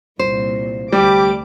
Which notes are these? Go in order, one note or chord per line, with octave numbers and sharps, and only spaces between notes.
C2 A#2 C5
D2 G3 G4 D6